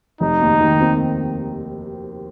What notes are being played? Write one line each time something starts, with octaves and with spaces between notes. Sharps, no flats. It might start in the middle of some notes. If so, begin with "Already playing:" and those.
F1 D#4
D#2
D#3
C4